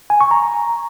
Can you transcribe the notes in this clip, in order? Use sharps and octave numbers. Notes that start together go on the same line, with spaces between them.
G#5
C#6
A#5